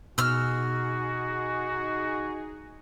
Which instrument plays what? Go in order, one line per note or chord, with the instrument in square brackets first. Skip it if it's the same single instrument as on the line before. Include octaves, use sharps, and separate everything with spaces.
[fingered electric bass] B2 [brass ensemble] D#4 G#4 [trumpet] F#4 [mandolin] E6 F6